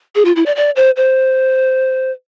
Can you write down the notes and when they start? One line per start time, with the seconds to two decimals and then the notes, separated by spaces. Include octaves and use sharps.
0.15 G#4
0.25 F4
0.36 E4
0.46 D5
0.56 D5
0.76 C5
0.97 C5